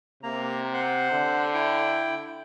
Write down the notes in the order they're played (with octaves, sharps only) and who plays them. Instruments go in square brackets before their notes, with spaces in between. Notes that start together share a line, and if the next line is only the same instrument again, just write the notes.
[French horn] C3 [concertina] A#3 A#5
[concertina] C5 F#5
[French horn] D3
[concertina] E4 G5